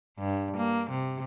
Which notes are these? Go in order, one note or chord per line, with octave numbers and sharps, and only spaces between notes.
G2
A#3
C3